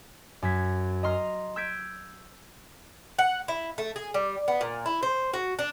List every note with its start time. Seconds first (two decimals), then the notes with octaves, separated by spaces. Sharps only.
0.42 F#2 G#6 B6
1.03 D#5 A#5 C6 F6 C7
1.56 E6 G6 G#6 B6 D7
3.19 F#5
3.48 E4
3.78 A3
3.96 G#4
4.14 G3
4.48 B3
4.61 A#2
4.86 E4
5.03 C5
5.34 F#4
5.59 D4